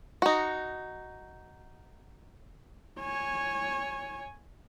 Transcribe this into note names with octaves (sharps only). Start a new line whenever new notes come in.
D#4 F#4
C#5 G#5